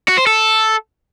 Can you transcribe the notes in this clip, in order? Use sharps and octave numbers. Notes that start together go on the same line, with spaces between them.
F#4
C5
A4